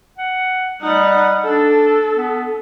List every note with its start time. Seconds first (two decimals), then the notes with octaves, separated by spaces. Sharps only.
0.18 F#5
0.81 G3 D#4 F#5
1.44 D4 A4
2.16 B3